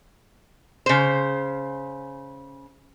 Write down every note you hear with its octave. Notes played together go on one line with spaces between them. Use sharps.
C#3 C5